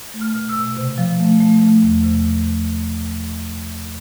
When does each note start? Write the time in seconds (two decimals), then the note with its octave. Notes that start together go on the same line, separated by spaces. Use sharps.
0.14 A3
0.21 F6
0.35 B2
0.49 E6
0.57 B2
0.77 C3
0.98 F3
1.20 A3
1.41 A3
1.62 A3
1.82 E2
2.04 C3